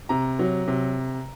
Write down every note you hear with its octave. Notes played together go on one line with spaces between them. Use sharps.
C3 A#5
F#3
C3